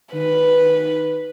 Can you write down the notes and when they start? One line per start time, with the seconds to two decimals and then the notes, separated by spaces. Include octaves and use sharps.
0.14 D#3 B4